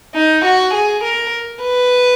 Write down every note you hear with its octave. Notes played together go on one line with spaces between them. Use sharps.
D#4
F#4
G#4
A#4
B4